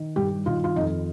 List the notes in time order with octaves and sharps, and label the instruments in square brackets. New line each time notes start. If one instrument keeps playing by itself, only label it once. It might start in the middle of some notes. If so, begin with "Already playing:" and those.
Already playing: [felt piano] D#3
G2 G4
D#3 F4
F4
F2 D#4